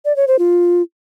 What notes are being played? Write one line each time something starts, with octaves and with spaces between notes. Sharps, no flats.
D5
C#5
C5
F4